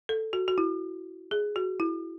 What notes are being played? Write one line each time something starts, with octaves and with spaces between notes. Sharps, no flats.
A4
F#4
F#4
E4
G#4
F#4
E4